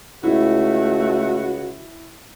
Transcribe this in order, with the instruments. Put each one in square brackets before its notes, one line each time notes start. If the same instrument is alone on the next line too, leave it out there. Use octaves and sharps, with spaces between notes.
[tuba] C#2 [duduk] A3 [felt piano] E4 [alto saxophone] F#4